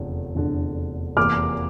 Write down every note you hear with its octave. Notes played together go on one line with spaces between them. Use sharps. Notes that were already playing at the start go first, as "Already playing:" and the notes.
Already playing: F1 E2 D3
F1 E2 D3
F1 E2 E3 A#3 D6 F6